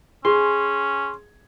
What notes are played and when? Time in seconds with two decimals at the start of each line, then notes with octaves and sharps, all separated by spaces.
0.25 C#4 G#4 C6